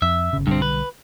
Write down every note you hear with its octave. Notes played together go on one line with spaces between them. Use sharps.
F2 E5
G1 C#3
B1 G2 D3 G3 C4
B4